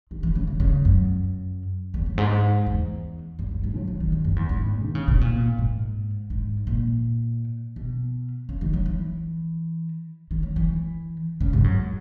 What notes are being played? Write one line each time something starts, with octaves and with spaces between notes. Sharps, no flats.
D#3
E3
C#3
E3
C#3
F#2
E2
F#2
G#2
E2
F#2
F#2
G#2
F#3
E3
D#3
E2
F#2
E2
G#2
D#3
C#3
B2
A#2
G#2
G#2
A#2
B2
C#3
D#3
F#3
E3
D#3
F#3
E3
C#3
G#2
F#2